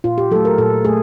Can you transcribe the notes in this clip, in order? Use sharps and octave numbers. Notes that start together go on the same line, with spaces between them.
A#2 F4
G4
F#3 A3 A4
A#4
A#2 A4
A3 G#4